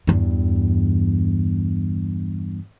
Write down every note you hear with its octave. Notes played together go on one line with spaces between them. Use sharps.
E2 G2